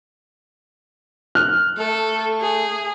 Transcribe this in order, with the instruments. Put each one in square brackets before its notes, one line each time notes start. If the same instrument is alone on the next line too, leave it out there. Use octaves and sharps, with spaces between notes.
[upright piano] F6 F#6
[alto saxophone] A3 [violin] A4
[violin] G#4